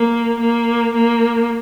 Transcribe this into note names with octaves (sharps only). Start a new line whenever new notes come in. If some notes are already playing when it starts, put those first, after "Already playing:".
Already playing: A#3
A#3
A#3